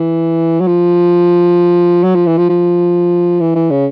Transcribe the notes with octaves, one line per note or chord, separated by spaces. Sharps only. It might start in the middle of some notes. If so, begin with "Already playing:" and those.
Already playing: E3
F#3
F3
F#3
F3
E3
F3
F3
E3
E3
C#3